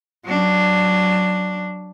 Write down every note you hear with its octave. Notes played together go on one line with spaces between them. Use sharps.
F#3 D4